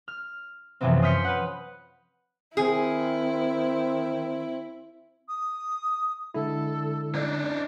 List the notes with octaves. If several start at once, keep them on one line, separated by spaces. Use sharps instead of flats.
F6
F#2 C3 E3 F3 B3 C4
C6 D#6 F6 G6 B6 C#7
B4 F#5
D#3 C4 E4 G#4
D#6
D3 G#3 E4 A4
D4 D#4